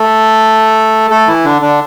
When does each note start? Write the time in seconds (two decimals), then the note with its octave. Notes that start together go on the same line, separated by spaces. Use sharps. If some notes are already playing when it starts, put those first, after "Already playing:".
Already playing: A3 A4
1.10 A3 A4
1.27 E3 E4
1.45 D3 D4
1.62 D3 D4